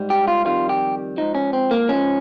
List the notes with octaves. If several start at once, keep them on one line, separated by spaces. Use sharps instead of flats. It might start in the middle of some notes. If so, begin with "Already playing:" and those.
Already playing: G#2 G3
G4
F4
F2 D#3 G3 F4
G4
G#2 F3 D#4
C#4
C4
A#3
G#2 F3 C#4